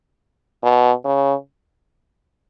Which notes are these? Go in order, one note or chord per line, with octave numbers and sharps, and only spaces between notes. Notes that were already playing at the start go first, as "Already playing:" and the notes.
B2
C#3